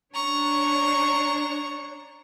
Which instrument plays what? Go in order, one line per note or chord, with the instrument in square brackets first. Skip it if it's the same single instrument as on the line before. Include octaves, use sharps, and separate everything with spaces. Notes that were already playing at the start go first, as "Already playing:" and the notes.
[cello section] D4 C#5 [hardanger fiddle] A#5 C#6